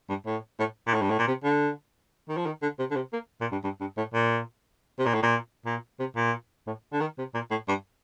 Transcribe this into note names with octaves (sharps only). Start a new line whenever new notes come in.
G2
A2
A2
A#2
A2
G2
A2
A#2
C3
D3
D#3
F3
D#3
D3
C3
D3
C3
A#3
A#2
G2
G2
G2
A2
A#2
C3
A#2
A2
A#2
A#2
C3
A#2
A2
D3
D#3
C3
A#2
A2
G2